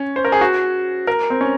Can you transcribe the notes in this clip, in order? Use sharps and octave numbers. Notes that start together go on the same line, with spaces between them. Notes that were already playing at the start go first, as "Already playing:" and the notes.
Already playing: C#4
C5
A#4
G#4
F#4
A#4
C4
C#4